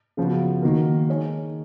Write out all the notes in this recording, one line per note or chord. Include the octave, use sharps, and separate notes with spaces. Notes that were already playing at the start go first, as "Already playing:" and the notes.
C#3 F3 B3 F#4
D#3 A#3 D#4 F#4 A#4
G#3 D#4 G#4 C#5